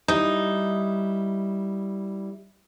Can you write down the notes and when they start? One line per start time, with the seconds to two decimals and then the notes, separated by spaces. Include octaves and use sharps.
0.08 G3 D#4 E4